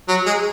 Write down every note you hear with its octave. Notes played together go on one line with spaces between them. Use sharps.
F#3
G#3